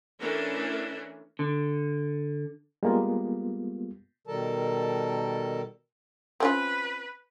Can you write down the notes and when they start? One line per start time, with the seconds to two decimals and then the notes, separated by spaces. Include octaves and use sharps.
0.21 E3 A3 C#4 D4 A4 A#4
1.39 D3
2.83 G3 G#3 A#3 B3 F4
4.27 B2 D#3 G3 A4 A#4 A5
6.40 C4 C#4 F4 B4